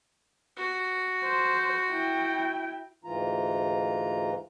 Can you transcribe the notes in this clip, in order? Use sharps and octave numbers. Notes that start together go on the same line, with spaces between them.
F#4
C5
E4 G5
D2 G#2 E3 F4 A#5